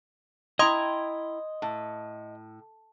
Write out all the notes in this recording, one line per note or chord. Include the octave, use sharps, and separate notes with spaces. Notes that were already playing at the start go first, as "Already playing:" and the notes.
E4 D#5 G5 A#5 C6 D#6 G#6
A2